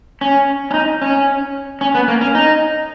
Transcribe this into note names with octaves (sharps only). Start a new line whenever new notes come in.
C#4
C#4
D#4
C#4
C#4
B3
A#3
C#4
D#4